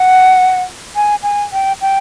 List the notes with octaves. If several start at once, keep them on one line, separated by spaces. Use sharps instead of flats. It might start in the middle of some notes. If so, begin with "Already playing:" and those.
Already playing: F#5
G#5
G#5
G5
G5